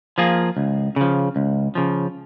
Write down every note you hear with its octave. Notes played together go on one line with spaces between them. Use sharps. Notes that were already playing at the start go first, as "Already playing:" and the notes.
F3 A#3 F4 G#4
C#2
C#3 F3
C#2
C#3 F3